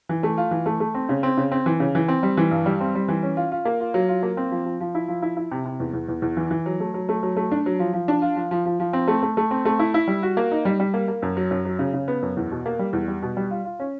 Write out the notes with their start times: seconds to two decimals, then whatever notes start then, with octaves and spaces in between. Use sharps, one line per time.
0.09 E3
0.23 A3
0.38 F4
0.51 E3
0.66 A3
0.80 A3
0.95 C4
1.09 C#3
1.23 C4
1.37 C#3
1.52 C4
1.66 E3
1.80 C#3
1.95 E3
2.08 C4
2.23 G3
2.37 E3
2.51 G2
2.66 G3
2.81 C4
2.95 G3
3.08 E3
3.23 C#4
3.37 F4
3.52 F4
3.65 A#3
3.80 F4
3.94 F#3
4.09 F4
4.23 A#3
4.37 C4
4.51 F3
4.65 F3
4.80 F3
4.95 E4
5.08 F3
5.22 E4
5.37 E4
5.52 C3
5.65 C3
5.80 E2
5.94 E2
6.08 E2
6.22 E2
6.37 E3
6.51 E3
6.66 F#3
6.80 A3
6.94 F#3
7.09 A3
7.23 F#3
7.37 A3
7.52 D4
7.66 F#3
7.79 F3
7.93 F3
8.08 D4
8.22 F4
8.36 F3
8.51 F3
8.65 F3
8.80 F3
8.93 C4
9.08 A3
9.23 A3
9.37 A3
9.51 C4
9.65 A3
9.79 E4
9.94 E4
10.08 G3
10.23 F#4
10.37 A#3
10.52 D#4
10.65 G3
10.80 G3
10.94 A#3
11.08 A#3
11.22 F#2
11.37 F#3
11.51 F#2
11.65 F#3
11.79 C#3
11.94 C#3
12.08 B3
12.22 F#2
12.37 E2
12.51 B2
12.66 A#3
12.79 G3
12.93 E2
13.08 G3
13.22 B2
13.37 G3
13.51 F4
13.65 F4
13.80 C#4